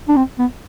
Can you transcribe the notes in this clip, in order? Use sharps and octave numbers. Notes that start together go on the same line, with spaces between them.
D4
C4
B3